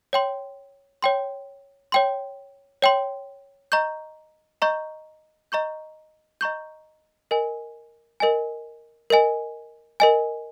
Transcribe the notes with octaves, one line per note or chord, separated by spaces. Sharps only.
C#5 G5 C6
C#5 G5 C6
C#5 G5 C6
C#5 G5 C6
D#5 A#5 C#6 G6
D#5 A#5 C#6 G6
D#5 A#5 C#6 G6
D#5 A#5 C#6 G6
A#4 D#5 G#5
A#4 D#5 G#5
A#4 D#5 G#5
A#4 D#5 G#5